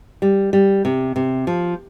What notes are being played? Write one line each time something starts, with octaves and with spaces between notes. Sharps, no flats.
G3
G3
C3
C3
F3